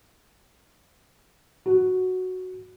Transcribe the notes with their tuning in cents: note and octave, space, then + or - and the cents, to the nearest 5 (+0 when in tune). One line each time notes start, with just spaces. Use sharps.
F#4 +0